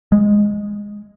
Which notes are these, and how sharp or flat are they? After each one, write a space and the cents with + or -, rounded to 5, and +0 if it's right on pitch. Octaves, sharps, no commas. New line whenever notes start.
G#3 -10